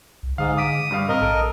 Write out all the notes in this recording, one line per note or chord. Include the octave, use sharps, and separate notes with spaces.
C2
G#2 D3 F5 D#6
D6 D#6 B6 D7
G2 G3 F5
G#2 C4 A#4 D#5
A#1 A4 D7